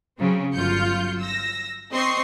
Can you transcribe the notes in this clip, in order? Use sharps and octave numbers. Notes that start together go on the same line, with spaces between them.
C#3 F#3 C4
G1 F#3 F4 G6 C#7
E6 A#6
C4 D#5 C6 C#6 C7